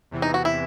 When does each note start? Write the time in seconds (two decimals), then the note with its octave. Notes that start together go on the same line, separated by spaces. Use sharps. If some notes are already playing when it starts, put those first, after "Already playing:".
0.11 E2 C3 E3
0.22 D#4
0.34 F#4
0.45 E4